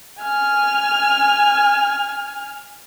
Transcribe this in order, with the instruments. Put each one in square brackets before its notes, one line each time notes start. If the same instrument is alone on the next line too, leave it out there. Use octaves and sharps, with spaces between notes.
[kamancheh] G#5 F6